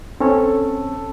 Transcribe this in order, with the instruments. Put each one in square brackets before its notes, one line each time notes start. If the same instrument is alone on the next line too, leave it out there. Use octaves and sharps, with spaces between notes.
[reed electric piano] C4 C#4 C#5 [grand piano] A4